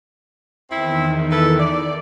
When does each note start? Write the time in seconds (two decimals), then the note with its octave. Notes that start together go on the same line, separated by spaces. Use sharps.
0.70 E2 D#3 C4 E4
1.31 E4 A4 B4
1.59 D5